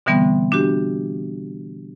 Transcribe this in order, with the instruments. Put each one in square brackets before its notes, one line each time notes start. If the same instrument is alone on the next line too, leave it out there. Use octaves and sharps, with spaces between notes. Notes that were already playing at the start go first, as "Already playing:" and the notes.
[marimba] B2 D3 E3 G3 B3 C4
D4 F#4 G4